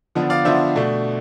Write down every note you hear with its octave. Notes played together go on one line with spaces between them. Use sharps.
D3 F3 B3 D4
D5 F5
D3 F3 B3 D4 C5 E5
B2 A3 D4